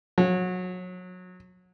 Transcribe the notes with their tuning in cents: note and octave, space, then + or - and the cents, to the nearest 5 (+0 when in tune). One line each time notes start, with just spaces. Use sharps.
F#3 -25